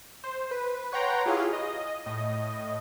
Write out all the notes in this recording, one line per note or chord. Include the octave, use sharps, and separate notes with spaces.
C5
B4
B4 C#5 F#5 G5 A#5 C6
E4 F4 G4 G#4 C#5 F5
D#5
A2 D#5